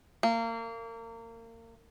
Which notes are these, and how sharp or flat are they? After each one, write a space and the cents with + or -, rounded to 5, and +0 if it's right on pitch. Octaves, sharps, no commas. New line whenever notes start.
A#3 -30